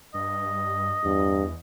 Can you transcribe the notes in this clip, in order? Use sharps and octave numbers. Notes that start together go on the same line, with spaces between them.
G2 D#5
E2 G2